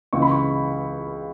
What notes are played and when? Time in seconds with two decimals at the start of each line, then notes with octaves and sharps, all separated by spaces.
0.13 C#2 C#3 E3 C#6
0.22 B5
0.31 C#6